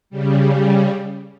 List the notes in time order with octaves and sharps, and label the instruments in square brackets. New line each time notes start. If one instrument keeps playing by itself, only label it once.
[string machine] C#3 G3